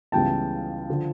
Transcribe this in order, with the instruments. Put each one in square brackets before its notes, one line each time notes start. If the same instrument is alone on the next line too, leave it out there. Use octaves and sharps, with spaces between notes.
[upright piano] C#2 C#3 E3 G3 B3 G5 A5
D3 F3